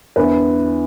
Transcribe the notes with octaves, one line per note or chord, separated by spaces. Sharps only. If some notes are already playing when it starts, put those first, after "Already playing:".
E2 D3 B3 E4 B4